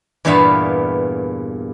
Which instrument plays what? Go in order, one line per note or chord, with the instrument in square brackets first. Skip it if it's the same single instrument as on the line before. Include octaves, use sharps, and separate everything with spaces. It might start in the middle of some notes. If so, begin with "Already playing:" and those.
[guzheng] E2 G2 A#2 B3 E5 F5